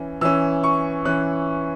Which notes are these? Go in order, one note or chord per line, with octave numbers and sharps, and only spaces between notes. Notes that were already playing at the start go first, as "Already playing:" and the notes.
Already playing: E3 C#4
E3 C#4 E6
C#6
E3 C#4 F#6